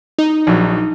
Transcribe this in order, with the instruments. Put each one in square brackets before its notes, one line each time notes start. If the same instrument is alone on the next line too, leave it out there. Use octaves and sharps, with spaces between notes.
[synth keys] D#4
[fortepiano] A#1 F#3